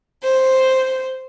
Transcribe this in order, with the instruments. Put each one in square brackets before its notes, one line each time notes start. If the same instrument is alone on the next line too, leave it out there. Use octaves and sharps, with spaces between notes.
[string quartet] C5